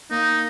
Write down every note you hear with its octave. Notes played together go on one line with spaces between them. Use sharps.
A#3 D#4